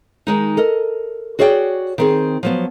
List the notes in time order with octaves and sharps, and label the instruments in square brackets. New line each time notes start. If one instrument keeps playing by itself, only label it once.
[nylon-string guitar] D#3 G#3 D#4
A4 A#4 D#5
F#4 G#4 C#5 D5 E5 G5
D#3 C4 G#4
F3 F#3 B3